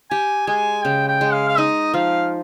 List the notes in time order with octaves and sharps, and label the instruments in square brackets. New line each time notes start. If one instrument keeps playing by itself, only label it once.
[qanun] G4 [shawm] G#5
[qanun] G#3 [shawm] G#5
[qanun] C#3 [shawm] G5
[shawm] G5
[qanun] G#3
[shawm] F5
F5
[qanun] D#4 [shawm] D#5
[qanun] F3 [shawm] F5